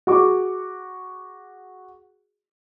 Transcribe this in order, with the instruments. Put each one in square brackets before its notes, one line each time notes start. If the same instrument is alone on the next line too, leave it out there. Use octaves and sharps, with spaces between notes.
[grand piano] F#4 G#4 C#6 D6